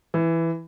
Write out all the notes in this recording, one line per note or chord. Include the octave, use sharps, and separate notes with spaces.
E3